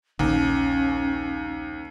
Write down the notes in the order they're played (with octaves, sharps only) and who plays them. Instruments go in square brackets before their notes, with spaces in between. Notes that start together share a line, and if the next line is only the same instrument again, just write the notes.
[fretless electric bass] A#1 [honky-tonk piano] D#2 [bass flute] C#4